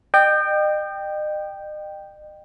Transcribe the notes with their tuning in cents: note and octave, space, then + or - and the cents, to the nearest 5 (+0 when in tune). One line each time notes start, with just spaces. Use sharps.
D#5 -40 G5 +0